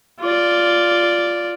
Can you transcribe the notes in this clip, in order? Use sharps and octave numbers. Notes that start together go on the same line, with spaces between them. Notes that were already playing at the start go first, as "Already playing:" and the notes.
F4 D5